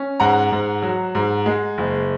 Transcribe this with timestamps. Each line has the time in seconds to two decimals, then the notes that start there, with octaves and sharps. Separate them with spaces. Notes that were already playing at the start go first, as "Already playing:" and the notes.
Already playing: C#4
0.20 G#2 F#5 A#5
0.52 G#2
0.82 F#3
1.15 G#2
1.46 G#3
1.78 F#1